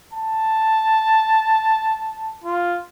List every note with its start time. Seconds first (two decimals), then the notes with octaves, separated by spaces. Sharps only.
0.13 A5
2.44 F4